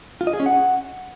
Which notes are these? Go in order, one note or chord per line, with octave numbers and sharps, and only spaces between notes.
F4
D#5
G#4
C#4
F#5